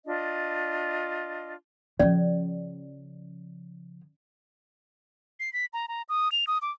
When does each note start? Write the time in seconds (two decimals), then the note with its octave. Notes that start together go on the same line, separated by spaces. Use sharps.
0.05 D4 F4 D#5
1.99 C#3 F3 C#4 D5
5.40 C7
5.53 B6
5.73 A#5
5.88 A#5
6.09 D#6
6.32 F7
6.47 D#6
6.62 D6